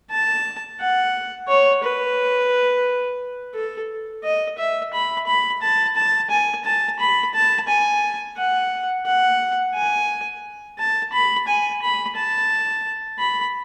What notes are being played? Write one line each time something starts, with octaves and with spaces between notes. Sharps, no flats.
A5
F#5
C#5
B4
A4
D#5
E5
B5
B5
A5
A5
G#5
A5
B5
A5
G#5
F#5
F#5
G#5
A5
B5
G#5
B5
A5
B5